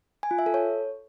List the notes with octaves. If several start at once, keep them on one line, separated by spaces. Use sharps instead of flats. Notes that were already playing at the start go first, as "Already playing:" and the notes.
G#5
F4
E5
A4
C#5